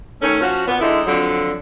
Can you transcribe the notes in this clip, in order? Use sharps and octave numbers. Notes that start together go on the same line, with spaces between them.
D#3 A3 C#4
F3 C#4 F#4
A#2 B3
D3 G#3 D#4 E4
F2 D3 F3 F#3